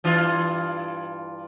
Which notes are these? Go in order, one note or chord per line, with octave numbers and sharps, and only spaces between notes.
G2 E3 F4